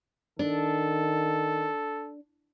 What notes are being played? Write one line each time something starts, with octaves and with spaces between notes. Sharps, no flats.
D#3 D4 A4